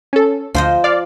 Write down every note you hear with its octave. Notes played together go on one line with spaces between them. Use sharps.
C#4 A4
D2 F3 C5 D#5
D5 F5